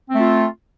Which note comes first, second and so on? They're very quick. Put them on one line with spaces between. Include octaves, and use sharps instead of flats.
C4 A3 F4